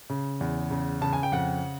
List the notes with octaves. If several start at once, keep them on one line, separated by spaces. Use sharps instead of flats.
C#3
E2
C#3
C#3 A5
G#5
G5
F2 F#5